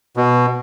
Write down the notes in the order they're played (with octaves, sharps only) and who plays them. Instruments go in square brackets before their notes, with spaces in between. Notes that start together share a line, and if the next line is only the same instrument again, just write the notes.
[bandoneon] B2